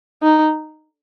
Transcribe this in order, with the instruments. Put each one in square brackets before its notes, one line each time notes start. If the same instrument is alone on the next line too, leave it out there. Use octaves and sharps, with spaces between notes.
[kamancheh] D#4